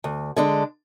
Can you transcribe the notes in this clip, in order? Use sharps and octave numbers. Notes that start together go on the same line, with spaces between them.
D2
D3 G#3 D4